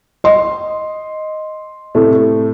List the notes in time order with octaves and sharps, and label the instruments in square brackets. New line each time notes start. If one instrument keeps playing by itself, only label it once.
[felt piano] D#5 C6
[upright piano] A2 C3 A3